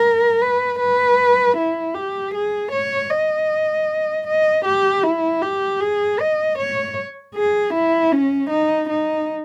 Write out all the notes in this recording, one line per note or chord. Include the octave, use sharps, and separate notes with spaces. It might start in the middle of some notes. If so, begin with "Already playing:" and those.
Already playing: A#4
B4
B4
E4
G4
G#4
C#5
D#5
D#5
G4
E4
G4
G#4
D#5
C#5
G#4
E4
C#4
D#4
D#4